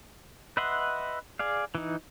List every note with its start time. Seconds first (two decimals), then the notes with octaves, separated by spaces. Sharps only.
0.57 B4 D#5 E5 F#5 C6
1.39 G#4 D5 F5
1.75 E3 D#4